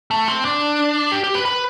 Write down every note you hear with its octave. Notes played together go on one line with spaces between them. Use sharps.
A3
C4
D4
G4
G4
B4
B4